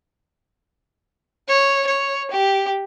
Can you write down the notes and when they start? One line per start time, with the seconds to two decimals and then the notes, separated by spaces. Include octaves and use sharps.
1.48 C#5
1.87 C#5
2.31 G4